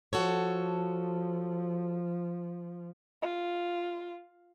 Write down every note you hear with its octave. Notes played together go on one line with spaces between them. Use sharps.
F3 F#4 A4 C#5
F4